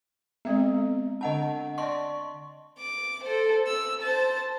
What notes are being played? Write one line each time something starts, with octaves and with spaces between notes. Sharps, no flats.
G#3 B3 C4 E5
D3 D4 D#5 F#5 A5
D5 D#5 A5 C6 C#6
D6
A4 C5
E6
C5 A5